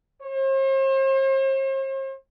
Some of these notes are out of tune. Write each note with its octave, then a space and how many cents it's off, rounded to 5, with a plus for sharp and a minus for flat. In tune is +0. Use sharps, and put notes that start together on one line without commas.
C5 +45